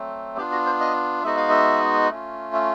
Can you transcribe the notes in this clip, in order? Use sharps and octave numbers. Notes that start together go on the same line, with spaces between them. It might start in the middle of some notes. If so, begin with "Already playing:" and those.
Already playing: F#3 A3 C4
B3 D4 F4 G4
F#4
C5
D#5
G#3 B3 D#4 F#4 E5
F5
E5
A3 C#4 F4
E5